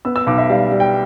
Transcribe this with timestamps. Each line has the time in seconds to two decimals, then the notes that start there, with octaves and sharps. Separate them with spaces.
0.05 B3 E6
0.16 E6
0.27 B1 D6
0.38 E5
0.49 G3 F5
0.72 G3
0.80 G5